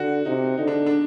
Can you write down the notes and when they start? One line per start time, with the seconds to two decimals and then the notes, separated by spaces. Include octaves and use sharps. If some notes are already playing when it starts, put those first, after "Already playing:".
Already playing: D3 F#4
0.25 C3 D#4
0.58 D3 D#4
0.67 D4
0.86 D4